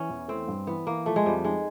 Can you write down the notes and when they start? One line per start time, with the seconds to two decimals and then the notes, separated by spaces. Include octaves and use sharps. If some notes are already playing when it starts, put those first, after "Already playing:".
Already playing: E3 C#4
0.10 E2
0.28 A3 C4
0.48 G2
0.67 E3 B3
0.87 E3 A#3
1.06 F3 A3
1.16 G#3
1.26 F2 G3
1.44 G#3 D#4